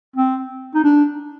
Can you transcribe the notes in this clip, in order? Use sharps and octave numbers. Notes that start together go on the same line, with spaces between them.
C4
D#4
D4